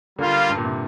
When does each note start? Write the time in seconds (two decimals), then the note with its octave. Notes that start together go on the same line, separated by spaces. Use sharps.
0.19 D3 G3 A#3 F4
0.50 G2
0.57 A#2
0.65 C3